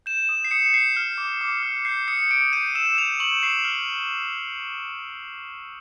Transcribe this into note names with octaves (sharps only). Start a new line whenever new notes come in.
G6 E7
D#6
C7
D#6 C#7
G6 C7
F6
D6
D6
F6
G6 C7
D#6 C#7
D#6 D7
G6 D#7
E6 E7
G6 F7
C#6 F#7
C#6 C7
F6